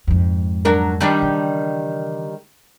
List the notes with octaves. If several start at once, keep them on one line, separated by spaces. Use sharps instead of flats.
F2 G#2
F#3 D4 A#4
D#3 G3 D4
C#3 E3